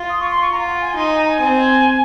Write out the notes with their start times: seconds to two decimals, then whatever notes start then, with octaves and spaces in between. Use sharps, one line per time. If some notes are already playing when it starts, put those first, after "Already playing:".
Already playing: F4
0.09 D#6
0.20 C#6
0.30 C6
0.41 C#6
0.52 F4 A#5
0.67 F#5
0.81 G#5
0.96 D#4 C6
1.07 G#5
1.18 A#5
1.28 G#5
1.40 C4